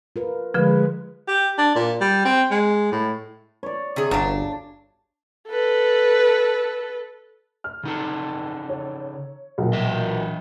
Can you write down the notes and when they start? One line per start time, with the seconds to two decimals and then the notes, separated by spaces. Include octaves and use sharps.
0.16 F4 A#4 B4
0.54 D3 F3 G#3 B4
1.28 G4
1.58 D4
1.75 A#2
2.01 G3
2.25 C4
2.51 G#3
2.92 A2
3.63 C#5 D5
3.96 C3 G#4
4.11 G1 C#3 F#3 D4
5.49 A4 B4
7.64 F6
7.83 C#3 D#4 A4
8.69 C#5
9.58 B1 A#2
9.73 E3 D#5 E5